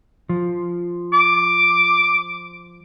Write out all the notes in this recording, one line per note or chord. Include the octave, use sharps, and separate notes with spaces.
F3
D6